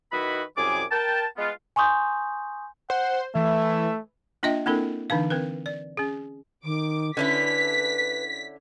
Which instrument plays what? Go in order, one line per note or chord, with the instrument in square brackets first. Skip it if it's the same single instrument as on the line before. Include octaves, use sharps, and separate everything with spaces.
[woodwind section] D#3 D#4 E4 F#4 B4 B5
C2 F#2 G3 G#4 G#5 D6
A#4 G5 A5
G#3 B3 F4
[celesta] G#5 C6 C#6 D#6 G6
[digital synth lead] C5 [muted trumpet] F#5
[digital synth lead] E3 [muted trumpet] A3 [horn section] E5
[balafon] A#3 D4 F4 D#5 E5 G5
A#3 C4 D4 E4 A4 A#4
D3 E3 D4 D#4 F5
C4 A#4 B4
D5
C#4 G#4
[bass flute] D#3 [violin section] D6
[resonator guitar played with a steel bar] D3 C#4 E4 [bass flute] B4 [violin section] B6